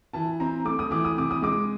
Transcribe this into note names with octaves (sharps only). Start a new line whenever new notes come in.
E3 A5
C4 A#5
A3 D6
D#6
E3 D6
D#6
C3 D6
D#6
G#3 D6